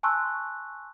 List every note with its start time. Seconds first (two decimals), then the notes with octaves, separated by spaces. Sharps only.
0.03 G#5 A5 C6 C#6 E6 F#6